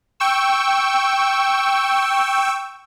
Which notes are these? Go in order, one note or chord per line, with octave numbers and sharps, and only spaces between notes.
G5 C#6 E6